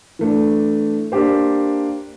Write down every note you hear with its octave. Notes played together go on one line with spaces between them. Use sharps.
E3 A3 D4
A#3 D4 G4 C5